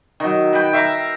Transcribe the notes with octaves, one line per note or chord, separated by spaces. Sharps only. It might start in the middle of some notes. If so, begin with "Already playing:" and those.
D#3 F#3
B4 G5
E5 F5 A#5